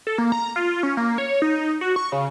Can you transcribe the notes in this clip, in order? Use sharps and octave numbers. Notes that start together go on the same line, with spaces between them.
A4
A#3
A#5
F4
C#4
A#3
C#5
D#4
F#4
C#6
C#3